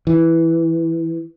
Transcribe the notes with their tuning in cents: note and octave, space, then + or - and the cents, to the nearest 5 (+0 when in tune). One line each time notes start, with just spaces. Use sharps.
E3 +0